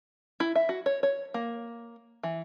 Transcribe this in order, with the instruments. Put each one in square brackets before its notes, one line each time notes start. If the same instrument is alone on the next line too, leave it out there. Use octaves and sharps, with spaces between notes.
[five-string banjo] E4
E5
F#4
C#5
C#5
A#3
E3